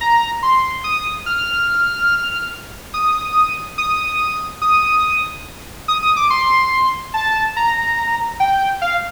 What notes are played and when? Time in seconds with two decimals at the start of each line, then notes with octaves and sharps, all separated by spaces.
0.01 A#5
0.43 C6
0.84 D#6
1.26 F6
2.94 D#6
3.78 D#6
4.62 D#6
5.88 D#6
6.03 D#6
6.17 D6
6.30 C6
7.14 A5
7.57 A#5
8.40 G5
8.82 F5